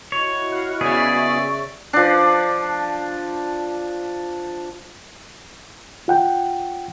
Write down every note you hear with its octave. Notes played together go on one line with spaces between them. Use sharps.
E4 F#4 C#5 D#5
F5 F#5
C#3 B3 G#4 C#5 D5 E5
F3 D4
F4 F#5 G5